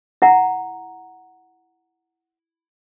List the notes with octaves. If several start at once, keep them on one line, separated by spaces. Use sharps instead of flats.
E4 F#5 A#5